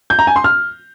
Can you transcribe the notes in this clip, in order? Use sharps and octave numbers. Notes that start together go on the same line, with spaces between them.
G6
A#5
G#5
C6
F6